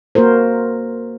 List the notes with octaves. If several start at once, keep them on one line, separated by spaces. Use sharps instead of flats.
A#3 F#4 A#4 C5